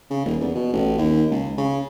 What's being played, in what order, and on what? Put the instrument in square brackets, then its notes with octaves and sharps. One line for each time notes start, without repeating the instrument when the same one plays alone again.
[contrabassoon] C#3
D#1
E2
B2
A1
D#2
C#2
C#3